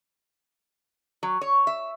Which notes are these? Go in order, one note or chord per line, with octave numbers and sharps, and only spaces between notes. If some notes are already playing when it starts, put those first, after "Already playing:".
F#3
C#5
E5